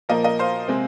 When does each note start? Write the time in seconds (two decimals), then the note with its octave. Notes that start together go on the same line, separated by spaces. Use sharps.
0.09 A#2 F3 A#3 A#4 D#5
0.24 A#4 D#5
0.39 C5 F5
0.68 C3 G#3 C4